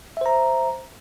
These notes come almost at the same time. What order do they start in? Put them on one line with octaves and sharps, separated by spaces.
E5 C5 A#5